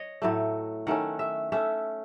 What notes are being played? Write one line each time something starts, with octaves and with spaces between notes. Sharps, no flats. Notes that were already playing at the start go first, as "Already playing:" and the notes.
Already playing: C#5 D#5
A2 F#3 A3
D#3 A3 C#4 F#5
E5
A3 C#4 E5